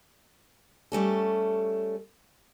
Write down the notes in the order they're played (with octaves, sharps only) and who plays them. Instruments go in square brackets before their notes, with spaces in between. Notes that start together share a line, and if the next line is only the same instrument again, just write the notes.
[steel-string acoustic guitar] G3 A3 C#4 A4